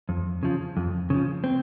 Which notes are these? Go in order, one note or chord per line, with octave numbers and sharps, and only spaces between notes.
F2
C#3 F3
F2
C#3 F3
C4